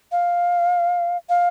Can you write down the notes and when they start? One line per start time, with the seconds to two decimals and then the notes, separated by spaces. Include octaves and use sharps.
0.12 F5
1.29 F5